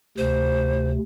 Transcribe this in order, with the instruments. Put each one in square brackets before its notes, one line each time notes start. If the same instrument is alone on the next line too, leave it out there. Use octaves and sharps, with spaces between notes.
[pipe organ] D2 C3 [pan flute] C5